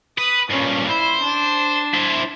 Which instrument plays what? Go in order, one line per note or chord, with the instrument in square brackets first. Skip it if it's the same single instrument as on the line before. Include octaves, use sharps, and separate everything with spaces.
[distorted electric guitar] B4 [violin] D#6
[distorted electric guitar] G2 A#2 [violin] C#4
[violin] E4 [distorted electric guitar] C5
[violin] D4
[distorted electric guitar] E4 C5